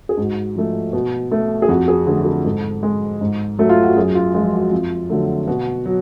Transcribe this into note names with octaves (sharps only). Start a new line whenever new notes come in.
G#4
G#2 F#4
F3 A3
B2
A3
G#4
F2 F#4
G#4
D3 F#3 A3 G#4
F#4
G#4
G#2 A4
G#3
G#2
F#3 A3
F4
F#4
F#2 G#4
F4
F3 G#3 F4
F#4
F2 F4
D3 F#3 A3
B2 F#4
F#3